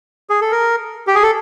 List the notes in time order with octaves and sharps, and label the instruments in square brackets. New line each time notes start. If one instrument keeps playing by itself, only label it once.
[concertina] G#4
A4
A#4
G4
G#4
A4